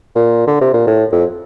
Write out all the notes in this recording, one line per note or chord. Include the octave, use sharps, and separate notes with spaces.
A#2
D3
C3
A#2
A2
F2